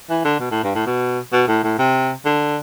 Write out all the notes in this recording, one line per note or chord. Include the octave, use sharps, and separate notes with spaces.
E3
D3
B2
A2
G2
A2
B2
B2
A2
A2
C3
D3